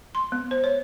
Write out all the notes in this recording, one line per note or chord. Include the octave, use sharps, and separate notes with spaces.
C6
B3
C5
C#5